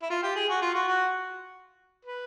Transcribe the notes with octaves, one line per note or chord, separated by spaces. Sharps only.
E4
F4
G4
G#4
F#4
F4
F#4
F#4
B4